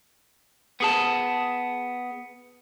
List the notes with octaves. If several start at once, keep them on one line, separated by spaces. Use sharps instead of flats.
B3 G#4 A5